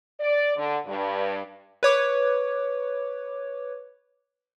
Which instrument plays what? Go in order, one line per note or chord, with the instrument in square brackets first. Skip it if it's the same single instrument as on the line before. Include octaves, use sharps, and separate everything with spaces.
[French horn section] D5
D3
G2
[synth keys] B4 C#5 D6